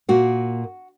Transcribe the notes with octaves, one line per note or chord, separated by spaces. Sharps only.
A#2 A#3 F#4